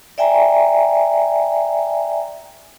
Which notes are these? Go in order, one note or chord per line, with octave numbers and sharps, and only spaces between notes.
D5 E5 G5 G#5 A#5